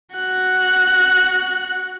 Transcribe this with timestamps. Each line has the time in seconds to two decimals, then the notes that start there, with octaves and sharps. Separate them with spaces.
0.16 F#4 F#6